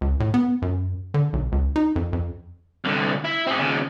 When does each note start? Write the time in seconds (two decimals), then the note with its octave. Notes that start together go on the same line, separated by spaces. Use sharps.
0.01 C#2
0.20 A2
0.34 B3
0.62 F#2
1.14 D3
1.33 B1
1.52 C#2
1.76 D#4
1.96 F2
2.13 F2
2.84 C2 D3
3.24 E4
3.47 C4 G#4
3.59 D#2 C#3